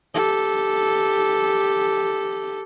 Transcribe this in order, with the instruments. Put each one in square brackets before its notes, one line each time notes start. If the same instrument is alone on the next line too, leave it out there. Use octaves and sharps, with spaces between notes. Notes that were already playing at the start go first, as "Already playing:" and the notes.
[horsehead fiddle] G4 A4